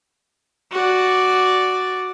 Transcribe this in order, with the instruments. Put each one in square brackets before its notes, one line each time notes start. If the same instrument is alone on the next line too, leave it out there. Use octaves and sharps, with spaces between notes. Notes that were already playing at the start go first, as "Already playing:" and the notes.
[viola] F#4 D5